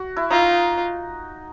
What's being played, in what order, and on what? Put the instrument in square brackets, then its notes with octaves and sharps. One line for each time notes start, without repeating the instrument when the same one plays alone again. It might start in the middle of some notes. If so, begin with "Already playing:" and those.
Already playing: [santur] F#4
E4
[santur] D#4 [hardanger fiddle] F4